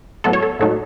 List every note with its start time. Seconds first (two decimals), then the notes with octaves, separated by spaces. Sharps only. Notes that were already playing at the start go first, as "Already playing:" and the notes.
0.24 A2 F#3 B3 A4
0.33 C#5
0.43 A4
0.59 A2 F#3 A3 D#4 A4